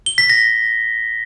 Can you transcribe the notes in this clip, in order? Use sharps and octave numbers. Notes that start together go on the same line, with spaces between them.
G7
B6
A#6